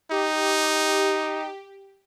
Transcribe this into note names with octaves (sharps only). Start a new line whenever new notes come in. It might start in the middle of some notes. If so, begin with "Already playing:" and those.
D#4 G4